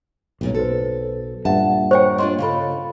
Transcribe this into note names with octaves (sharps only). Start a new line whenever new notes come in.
B1 G2 A#2 C#4
F#4 A4 B4 C5
G2 A#2 E5 F#5 A5
D#2 A#4 C5 C#5 G5 C#6
A#3 D4 F4 D#5 C6
C#3 F4 A4 F5 B5